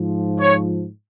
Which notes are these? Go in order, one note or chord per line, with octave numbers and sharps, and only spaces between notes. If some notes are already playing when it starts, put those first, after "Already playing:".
Already playing: G#2 F3
C#5